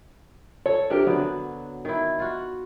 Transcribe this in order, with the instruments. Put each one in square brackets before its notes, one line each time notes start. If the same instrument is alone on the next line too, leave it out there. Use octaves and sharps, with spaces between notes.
[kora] A4 [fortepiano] C#5
[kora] C3 A#4 [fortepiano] D4 G4
[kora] D3 B3 [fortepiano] F#3
[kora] D#3 E4
F4 F#4